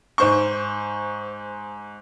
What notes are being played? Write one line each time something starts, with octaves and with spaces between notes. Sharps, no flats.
G#2 C5 C#6